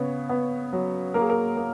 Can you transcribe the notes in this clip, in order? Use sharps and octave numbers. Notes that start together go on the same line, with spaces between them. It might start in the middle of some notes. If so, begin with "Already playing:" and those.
Already playing: C#3 B3 C#5
B3
F#3
A#3 A#4
G#4
A#4
A#3